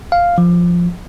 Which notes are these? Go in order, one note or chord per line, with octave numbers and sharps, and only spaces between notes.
F5
F3